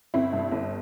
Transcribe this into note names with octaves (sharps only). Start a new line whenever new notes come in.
G1 C4 E4
G2
G1